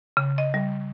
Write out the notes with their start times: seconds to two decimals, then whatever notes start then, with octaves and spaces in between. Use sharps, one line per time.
0.17 C#3
0.38 D#5
0.54 G3